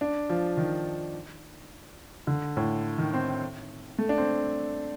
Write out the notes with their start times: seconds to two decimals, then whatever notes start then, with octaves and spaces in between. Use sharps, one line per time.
0.01 D4
0.30 F3
0.57 D#3
2.27 D3
2.57 A2
2.98 D#3
3.14 C4
3.98 A3
4.09 D4
4.18 C4